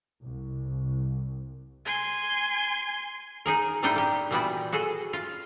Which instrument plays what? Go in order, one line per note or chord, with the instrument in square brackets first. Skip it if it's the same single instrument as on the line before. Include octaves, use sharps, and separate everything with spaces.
[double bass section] C2
[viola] G#5 C6
[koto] D#4 G#4 A#4
A2 G3 A3 D4 D#4 G5
A#3 G4
A#2 E3 G3 B3 F#4 D5
F#4 G#4 A4
F4